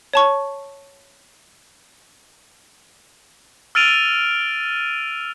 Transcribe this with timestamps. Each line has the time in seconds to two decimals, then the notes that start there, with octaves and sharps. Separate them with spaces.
0.13 C#5 A5 C#6
3.75 E6 F6 A6 D7 D#7 F7